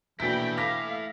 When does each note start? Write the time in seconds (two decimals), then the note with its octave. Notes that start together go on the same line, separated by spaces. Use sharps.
0.20 A#1 B2 E3 E4 A4 G5 B5 B6
0.57 A3 F5 D6 A#6 B6